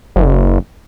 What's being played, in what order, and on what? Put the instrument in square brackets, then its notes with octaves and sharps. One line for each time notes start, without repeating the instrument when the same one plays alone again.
[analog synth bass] F#1